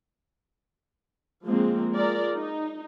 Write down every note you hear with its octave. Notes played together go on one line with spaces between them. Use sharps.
F3 G#3 A#3 C4
G#3 F4 A#4 D5
D#4